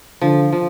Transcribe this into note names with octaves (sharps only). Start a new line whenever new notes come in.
D3 F3
F3